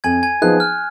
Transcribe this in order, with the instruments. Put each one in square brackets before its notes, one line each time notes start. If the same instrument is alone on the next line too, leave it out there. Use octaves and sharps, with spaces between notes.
[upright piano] F2 [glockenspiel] G#5 G#6
[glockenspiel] G#5 G#6
[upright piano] F3 B3 D#4 G#4 [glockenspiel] F#6
[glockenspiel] F6